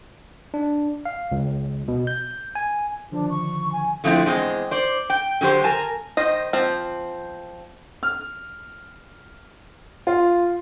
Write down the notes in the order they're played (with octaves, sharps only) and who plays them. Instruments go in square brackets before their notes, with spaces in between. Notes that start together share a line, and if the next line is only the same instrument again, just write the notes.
[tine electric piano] D4
F5
C#2
B2
G6
G#5
[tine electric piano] D3 D#3 F3 [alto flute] D4
[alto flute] C#6
G#5
[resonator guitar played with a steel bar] D3 F3 A3 C4 E4
E2 G#3 C4
C5 D5
G5
D3 F#3 G4 C5
A#4 G#5 A5
[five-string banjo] D#3 C5 D#5
F3 C4
[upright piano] F6
F4